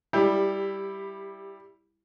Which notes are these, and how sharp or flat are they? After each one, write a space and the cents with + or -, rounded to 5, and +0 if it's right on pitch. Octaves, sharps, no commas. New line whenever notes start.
G3 +0 E4 +0 G4 +20